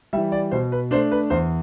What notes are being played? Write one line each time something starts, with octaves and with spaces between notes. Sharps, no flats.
E3 G3 E5
D5
B2 C5
B4
A3 D4 C5
B4
E2 C5